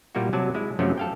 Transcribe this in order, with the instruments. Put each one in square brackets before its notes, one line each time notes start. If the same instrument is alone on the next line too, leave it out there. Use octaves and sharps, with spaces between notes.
[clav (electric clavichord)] A#2 G3 A#3 E4 F#4
C3 F#3 D5 G#5 A5
G#3 E4
F#2 C3 F3 F#3 A3 C#4
A4 F5 G5